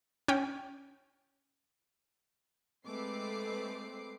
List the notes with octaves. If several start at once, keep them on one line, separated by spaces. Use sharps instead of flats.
C#4 G5
G#3 A3 C4 B4 D6 C7